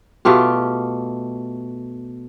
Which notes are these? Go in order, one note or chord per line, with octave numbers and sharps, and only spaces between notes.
B2 A3 F4 G4